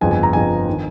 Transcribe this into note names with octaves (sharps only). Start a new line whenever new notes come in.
G1 F2 C#3 G#5
G#5
A#5
G1 F2 C#3 G#5
D#3